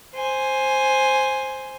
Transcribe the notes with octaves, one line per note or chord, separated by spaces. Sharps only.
C5 G#5